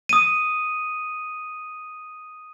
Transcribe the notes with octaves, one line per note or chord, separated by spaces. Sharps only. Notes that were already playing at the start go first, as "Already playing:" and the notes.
D#6 D#7